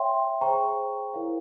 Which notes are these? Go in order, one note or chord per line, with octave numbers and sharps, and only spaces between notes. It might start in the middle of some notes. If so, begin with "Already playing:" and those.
Already playing: C#5 E5 G5 C6
G#4 C5 G5 A#5 C#6
E4 A#4 C#5 F5